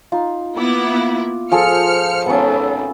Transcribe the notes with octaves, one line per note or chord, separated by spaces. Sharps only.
D#4 F4
A#3 B3 E4 D6
F3 G#4 A4 C5 F6 C#7
G#1 B3 C#4 A4